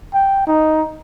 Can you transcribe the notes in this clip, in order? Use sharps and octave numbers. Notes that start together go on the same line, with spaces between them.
G5
D#4